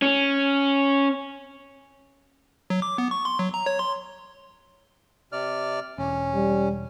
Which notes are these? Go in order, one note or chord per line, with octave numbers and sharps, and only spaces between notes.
C#4
F#3
D6
B3
C#6
C6
F#3
A#5
C#5
C6
C3 D5 F6
E1 C#4
G3